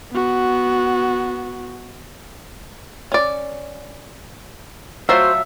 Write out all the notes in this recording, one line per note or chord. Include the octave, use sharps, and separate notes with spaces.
B3 F#4
C#4 D5
F#3 A3 F4 F#4 C5 E5